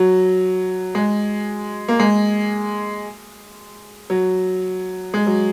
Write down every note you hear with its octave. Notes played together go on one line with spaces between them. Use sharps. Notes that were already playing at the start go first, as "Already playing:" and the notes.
Already playing: F#3
G#3
A#3
G#3
F#3
G#3
F#3